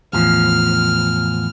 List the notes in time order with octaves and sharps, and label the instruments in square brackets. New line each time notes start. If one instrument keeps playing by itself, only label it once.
[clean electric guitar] E2 A2 F3 [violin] F6